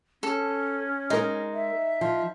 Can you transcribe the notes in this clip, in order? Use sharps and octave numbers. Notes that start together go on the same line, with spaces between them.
C#4 A4
G#3 D#4 A#4
E5
F3